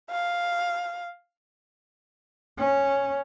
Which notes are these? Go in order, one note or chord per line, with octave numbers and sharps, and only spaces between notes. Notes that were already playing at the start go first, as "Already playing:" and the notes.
F5
C#4